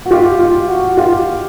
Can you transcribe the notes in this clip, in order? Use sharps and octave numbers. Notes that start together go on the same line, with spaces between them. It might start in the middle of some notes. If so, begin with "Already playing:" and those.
F#4
F4 G4
F4
F#4
F4 G4